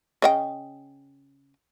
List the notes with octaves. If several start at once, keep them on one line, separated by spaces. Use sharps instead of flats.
C#3 D#5 G5